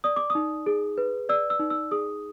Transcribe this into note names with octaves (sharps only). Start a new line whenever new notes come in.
D5 D#6
D6
D#6
D#4
G#4
B4
D5 E6
E6
D#4
E6
G#4 D#6